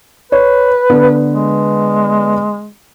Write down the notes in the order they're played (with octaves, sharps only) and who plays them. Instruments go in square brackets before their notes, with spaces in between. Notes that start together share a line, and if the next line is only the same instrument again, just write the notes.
[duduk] B4 [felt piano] C#5
[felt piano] D3 B3
[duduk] G#3